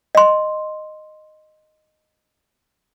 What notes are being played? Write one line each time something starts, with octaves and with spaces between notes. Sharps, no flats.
D#5 C6